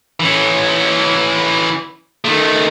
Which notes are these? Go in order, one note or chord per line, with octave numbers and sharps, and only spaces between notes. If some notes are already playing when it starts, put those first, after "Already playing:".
E3 C#4
D#3 A3